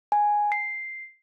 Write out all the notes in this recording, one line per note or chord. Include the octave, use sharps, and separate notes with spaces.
G#5
C7